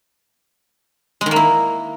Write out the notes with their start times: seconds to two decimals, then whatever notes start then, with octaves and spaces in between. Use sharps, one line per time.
1.21 G#3
1.26 D#3
1.31 A#3
1.36 E4